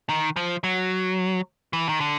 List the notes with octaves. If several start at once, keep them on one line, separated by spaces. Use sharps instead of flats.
D#3
F3
F#3
E3
D#3
D3